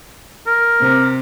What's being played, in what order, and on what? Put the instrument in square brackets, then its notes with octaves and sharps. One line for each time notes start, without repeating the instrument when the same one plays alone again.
[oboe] A#4
[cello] C3